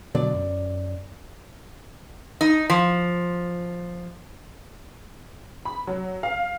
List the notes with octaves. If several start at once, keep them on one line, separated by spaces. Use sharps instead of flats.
B2 D3 F#3 D5
F#2
D#4
F3
B5
F#3
F5